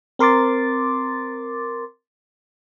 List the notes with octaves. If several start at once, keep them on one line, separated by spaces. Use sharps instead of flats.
C4 A#4 C6 D6 A6